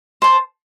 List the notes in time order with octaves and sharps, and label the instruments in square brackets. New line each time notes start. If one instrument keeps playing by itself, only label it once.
[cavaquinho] C5 A5